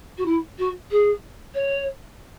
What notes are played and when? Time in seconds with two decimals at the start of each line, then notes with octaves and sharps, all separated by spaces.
0.17 F#4
0.25 E4
0.58 F#4
0.90 G#4
1.54 C#5